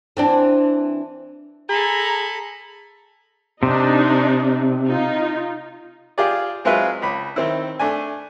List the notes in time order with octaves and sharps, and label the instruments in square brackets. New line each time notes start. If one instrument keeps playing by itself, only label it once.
[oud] E3 C4 D4
[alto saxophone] G#4 [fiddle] A4 B5 [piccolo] A#5
[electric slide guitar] C3 [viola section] D4 D#4
[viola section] D#4 F4
[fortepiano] F4 G4 G#4 D5
F#3 G#3 C4 F4 B4 E5
C#2 B5
D#3 C4 E4
A3 D4 G#5